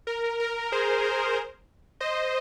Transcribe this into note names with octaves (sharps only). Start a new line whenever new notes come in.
A#4
A#4
G#4 C5
A#4
C5 D#5